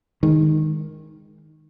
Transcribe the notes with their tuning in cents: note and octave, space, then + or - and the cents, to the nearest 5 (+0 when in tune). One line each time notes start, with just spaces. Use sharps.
D#3 +0 G#3 -10